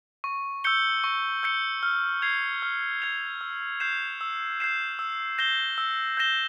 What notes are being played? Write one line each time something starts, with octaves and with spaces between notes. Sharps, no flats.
C#6
E6 G6 C#7 G7
C#6
E6 G6 C#7 G7
F6
G#6 C7 F7
F6
G#6 C7 F7
E6
G6 C7 E7
E6
G6 C7 E7
E6
G6 A#6 E7 G7
E6
G6 A#6 E7 G7